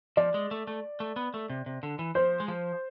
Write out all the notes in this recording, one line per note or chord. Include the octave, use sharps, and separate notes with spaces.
F3 D5
G#3
A3
A3
A3
B3
A3
C3
C3
D3
E3
F3 C5
G#3
F3